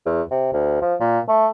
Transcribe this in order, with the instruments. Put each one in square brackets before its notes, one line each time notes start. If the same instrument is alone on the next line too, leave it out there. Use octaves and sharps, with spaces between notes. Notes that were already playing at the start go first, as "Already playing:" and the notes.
[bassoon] E2
C3
D2
F3
A#2
A3